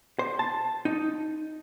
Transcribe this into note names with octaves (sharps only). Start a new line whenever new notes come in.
C5
A5
D#4